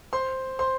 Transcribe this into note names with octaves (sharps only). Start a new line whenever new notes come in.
C5 C6
C5 C6